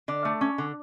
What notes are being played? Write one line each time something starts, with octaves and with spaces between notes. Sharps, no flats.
D3 D5
A3
C#4
D3